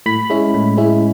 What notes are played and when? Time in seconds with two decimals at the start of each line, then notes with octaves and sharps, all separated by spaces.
0.06 A2 B5
0.30 G#3 C#4 E4
0.54 A2
0.78 G#3 C#4 E4